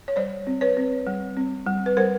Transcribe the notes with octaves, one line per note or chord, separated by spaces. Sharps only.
C#5
G3 C5 D5
C4
B4 C#5
C4
G3
C4
G3
B4
G3 A#4 C5